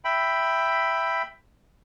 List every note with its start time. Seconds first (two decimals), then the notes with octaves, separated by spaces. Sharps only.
0.05 E5 G5 B5